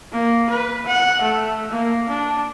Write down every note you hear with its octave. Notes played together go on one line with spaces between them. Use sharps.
A#3
B4
F#5
A3
A#3
D4